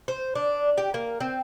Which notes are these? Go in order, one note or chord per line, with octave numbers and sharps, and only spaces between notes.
C5
D4
G4
A#3
C4